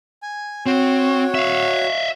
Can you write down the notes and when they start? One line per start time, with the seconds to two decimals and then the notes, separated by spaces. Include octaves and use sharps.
0.23 G#5
0.66 C4 F#4 C#5
1.35 E5 F5